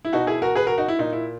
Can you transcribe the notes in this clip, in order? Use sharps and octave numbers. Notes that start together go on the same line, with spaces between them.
E4
B2 D#4 F#4
E4 G#4
F#4 A#4
G#4 B4
F#4 A#4
D#4 F#4
E4
A#2 D#4
E4